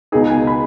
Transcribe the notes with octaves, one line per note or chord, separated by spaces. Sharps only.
C#2 B2 B3 D#4 G#4
G#5
B5